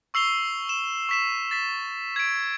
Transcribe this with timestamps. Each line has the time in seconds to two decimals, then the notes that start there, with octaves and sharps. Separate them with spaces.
0.14 C#6 E6 C7 F7 G7
0.69 E7
1.09 C#6 B6 E7
1.51 A6 B6
2.16 G#6 D7